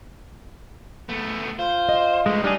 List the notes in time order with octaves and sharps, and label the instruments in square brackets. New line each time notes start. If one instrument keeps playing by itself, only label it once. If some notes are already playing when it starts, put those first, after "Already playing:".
[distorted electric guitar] A3 B3
[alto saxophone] F4 [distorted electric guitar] C5
[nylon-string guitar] D#5
[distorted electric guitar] G2 A3 [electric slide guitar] G#3
[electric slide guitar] G3 G#4 [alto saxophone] D4 [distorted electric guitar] D#4